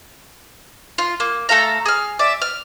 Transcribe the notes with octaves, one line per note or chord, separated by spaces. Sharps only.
F4
A#3
A3 A4 F5 A#5
G#4 F6
D5 E5
F6